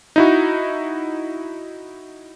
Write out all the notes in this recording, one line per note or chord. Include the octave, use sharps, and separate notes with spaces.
D#4 E4 F#4